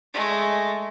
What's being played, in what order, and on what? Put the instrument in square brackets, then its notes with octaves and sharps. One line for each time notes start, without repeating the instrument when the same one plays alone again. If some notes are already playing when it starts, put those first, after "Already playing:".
[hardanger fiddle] G#3 A3